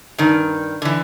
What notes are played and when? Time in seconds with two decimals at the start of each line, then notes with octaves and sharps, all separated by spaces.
0.18 G2 D#3
0.82 D3 E3